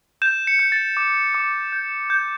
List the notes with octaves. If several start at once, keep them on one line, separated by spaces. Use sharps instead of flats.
G6 E7
C#7
G6
A6
D6
D6
G6
G6